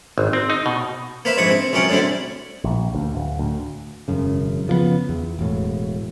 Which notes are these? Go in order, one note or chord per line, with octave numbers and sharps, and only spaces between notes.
G#1
C4
D#4
B2
A#3 B4 C5 E5
A#1 G#2 E4 C#6 D#6
C4
C#2 F#2 C#4 A#4 F#5 G5
A2 D3 G3 C4 E4
A#1
D2
D1
D2
E1 F#2 C#3
C#3 F3 G3 B3
E2
E1 A2